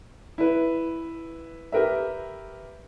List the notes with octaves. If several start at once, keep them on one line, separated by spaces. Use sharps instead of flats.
E4 B4
G4 A#4 B4 E5